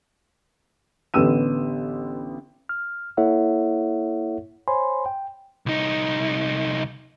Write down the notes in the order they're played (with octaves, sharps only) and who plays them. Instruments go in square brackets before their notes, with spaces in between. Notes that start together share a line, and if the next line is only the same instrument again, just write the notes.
[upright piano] A1 D3 B3 G4 E6 D#7
[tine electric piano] F6
A#3 E4 A4 C#5 E5 F#5
C5 C#5 G#5 B5 C6
G5
[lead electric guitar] C2 D#4